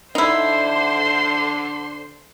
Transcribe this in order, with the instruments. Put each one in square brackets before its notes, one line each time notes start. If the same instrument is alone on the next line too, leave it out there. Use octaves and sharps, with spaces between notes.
[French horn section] D3 [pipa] D#4 E4 [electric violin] C5 C6